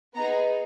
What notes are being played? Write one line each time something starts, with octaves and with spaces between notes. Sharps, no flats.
B3 D#4 G#4 A#5